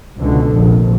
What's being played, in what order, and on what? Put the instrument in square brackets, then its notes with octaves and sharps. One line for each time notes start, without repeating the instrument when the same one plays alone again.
[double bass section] C#2 B2 D3
F1 A#1